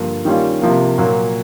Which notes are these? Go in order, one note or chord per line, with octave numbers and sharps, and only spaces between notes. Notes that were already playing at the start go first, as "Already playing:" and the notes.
Already playing: G2 D3 F3 A#3
D#3 G3 A#3 C#4 F4
C3 F3 A#3
A#2 F#3 A#3